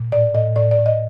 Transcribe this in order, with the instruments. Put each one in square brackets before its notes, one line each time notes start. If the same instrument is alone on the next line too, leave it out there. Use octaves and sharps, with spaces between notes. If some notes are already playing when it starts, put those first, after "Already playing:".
Already playing: [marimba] A#2
A2 D5
A2 D#5
A2 D5
D5
A2
D#5